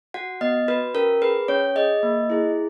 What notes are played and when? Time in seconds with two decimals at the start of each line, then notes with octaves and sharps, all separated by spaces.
0.14 F#4 F#5
0.41 B3 D#5
0.68 F#4 B4
0.94 C#4 A#4
1.22 G#4 B4
1.48 C#4 C#5
1.75 G#4 D#5
2.03 A#3
2.30 E4 G#4